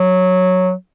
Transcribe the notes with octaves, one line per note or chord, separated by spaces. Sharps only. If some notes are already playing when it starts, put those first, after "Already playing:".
Already playing: F#3